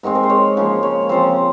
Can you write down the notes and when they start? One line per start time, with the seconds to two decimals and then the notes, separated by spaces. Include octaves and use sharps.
0.03 G#2 D#3 G#3 C4
0.15 A#4
0.23 C5
0.30 C#5
0.57 C#3 F3 A#3
0.83 C#5
1.09 C#3 F3 C4 C5